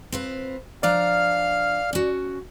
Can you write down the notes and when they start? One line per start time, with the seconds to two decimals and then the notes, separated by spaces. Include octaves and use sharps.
0.12 C4 F4 B4
0.83 F3 D4 D5 F5 A#5 F6
1.93 C#4 F#4